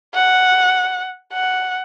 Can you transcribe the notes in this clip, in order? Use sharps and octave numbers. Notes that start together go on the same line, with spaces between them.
F#5
F#5